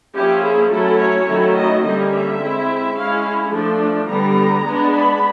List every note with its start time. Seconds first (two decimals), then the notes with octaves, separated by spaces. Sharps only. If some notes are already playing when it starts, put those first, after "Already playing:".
0.15 F3 A#3 C#4 E4 G4
0.43 G#4
0.71 F#3 A3 C#4 E4 A4
0.99 C#5
1.27 D#3 F#3 A3 C#4 E4
1.56 D#5
1.83 D3 G3 A#3 C#4 D#5
2.11 E5
2.40 G#3 C4 E4
2.95 G#3 C#4 E4 F5
3.52 F3 A3 D4
4.08 D3 G3 B3 A#5
4.65 G#3 B3 D4
4.93 B5